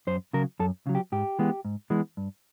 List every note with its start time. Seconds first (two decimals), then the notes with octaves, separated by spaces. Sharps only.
0.07 F#2 C5
0.33 C#3 F#3 A#4
0.60 F#2 A4
0.87 C#3 F#3
0.95 G4
1.12 G#2 G4
1.39 E3 G#3 B3
1.65 G#2
1.90 E3 G#3 B3
2.17 G2